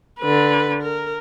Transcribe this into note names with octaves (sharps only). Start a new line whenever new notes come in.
D3 B4
A#4